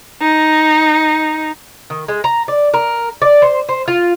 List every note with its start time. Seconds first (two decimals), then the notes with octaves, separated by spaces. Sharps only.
0.21 D#4
1.90 D#3
2.08 G#3
2.24 A#5
2.48 D5
2.74 A#4
3.22 D5
3.42 C5
3.69 C5
3.88 F4